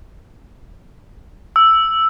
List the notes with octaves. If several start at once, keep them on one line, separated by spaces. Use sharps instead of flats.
E6